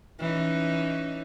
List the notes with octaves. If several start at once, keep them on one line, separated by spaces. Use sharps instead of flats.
E3 C#4 D#4